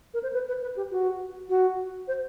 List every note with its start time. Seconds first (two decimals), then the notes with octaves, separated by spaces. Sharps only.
0.14 A#4
0.23 C5
0.33 B4
0.48 B4
0.62 B4
0.76 G4
0.91 F#4
1.49 F#4
2.08 C5